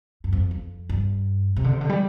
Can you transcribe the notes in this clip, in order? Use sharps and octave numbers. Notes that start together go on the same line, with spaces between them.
G2
F2
F2
G2
C3
D3
C3
D3
G3